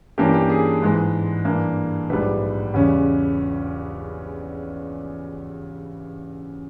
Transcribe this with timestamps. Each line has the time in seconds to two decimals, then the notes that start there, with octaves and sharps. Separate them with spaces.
0.18 G2 E3 A#3 C#4 G4
0.34 G4
0.50 G#4
0.82 G#2 E3 G#3
1.45 G2 E3 A#3
2.10 A#1 G#2 G3 B4
2.74 E2 C#3 G3 C#4